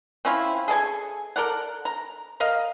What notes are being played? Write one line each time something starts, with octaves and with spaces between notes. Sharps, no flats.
C4 C#4 E4 F4
G#4 A4 D5 G#5
A4 A#4 D5 F#5
A#5
A#4 D#5 F5